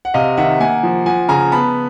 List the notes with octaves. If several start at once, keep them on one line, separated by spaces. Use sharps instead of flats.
F#5
C3 D#5 F5
D#3 E5 F#5
A#3 F#5 G#5
F3
F3 F#5 G#5
C#3 G#5 A#5
B3 A5 B5